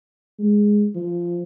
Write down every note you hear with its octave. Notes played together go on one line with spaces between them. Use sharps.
G#3
F3